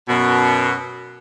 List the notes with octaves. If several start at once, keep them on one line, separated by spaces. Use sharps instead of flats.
F#2 B2